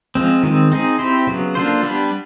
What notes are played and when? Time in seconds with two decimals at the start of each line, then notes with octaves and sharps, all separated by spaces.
0.15 F3 G#3 C4
0.43 D#3 G#3 C4
0.72 C4 D#4 G#4
0.99 C4 E4 G4 C5
1.27 C#3 F#3 B3
1.55 A#3 D4 F4 A4 C5
1.83 G3 B3 D4 G4 B4